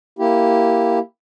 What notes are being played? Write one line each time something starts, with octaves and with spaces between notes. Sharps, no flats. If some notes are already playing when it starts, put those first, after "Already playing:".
A#3 E4 G4